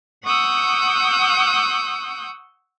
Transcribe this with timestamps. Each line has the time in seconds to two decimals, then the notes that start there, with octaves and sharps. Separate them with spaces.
0.24 F#5 C#6 D#6 E6 F#6 G6